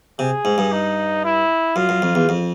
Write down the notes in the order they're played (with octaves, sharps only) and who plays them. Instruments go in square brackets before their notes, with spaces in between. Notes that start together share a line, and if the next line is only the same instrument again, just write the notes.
[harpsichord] C3 [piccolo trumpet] G#4
[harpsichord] G#2
G2
[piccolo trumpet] D#4
E4
[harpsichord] F#2 [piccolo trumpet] F4
[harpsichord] F#2
F2
E2
F2